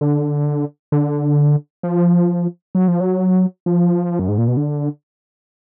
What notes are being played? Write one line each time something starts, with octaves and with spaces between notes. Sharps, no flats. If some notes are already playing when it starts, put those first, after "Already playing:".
D3
D3
F3
F#3
F3
F#3
F3
F#2
G#2
A#2
B2
D3